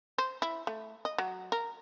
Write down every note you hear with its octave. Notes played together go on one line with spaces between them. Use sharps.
C5
E4
A3
D#5
F#3
A#4